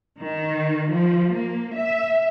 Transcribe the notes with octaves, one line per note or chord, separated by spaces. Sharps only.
D#3
F3
A#3
E5